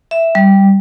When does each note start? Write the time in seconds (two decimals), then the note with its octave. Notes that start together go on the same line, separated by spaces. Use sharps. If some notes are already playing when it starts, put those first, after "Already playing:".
0.11 E5
0.35 G3